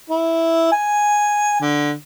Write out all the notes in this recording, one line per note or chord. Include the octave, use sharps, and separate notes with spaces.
E4
G#5
D3